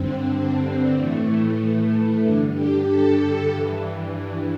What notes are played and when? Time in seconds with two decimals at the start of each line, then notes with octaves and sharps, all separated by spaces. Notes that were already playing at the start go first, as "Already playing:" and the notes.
Already playing: G2 D3 C4
0.96 A2 E3 A3
2.23 G2 D3 D4
2.54 G4
2.86 A4
3.49 G2 E3